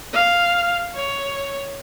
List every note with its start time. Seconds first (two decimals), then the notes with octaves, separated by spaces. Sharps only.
0.13 F5
0.95 C#5